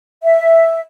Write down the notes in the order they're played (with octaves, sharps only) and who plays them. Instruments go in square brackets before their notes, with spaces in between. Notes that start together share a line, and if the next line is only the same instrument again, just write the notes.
[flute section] E5